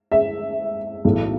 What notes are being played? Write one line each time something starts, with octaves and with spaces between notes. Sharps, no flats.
E5
B1 A2 E3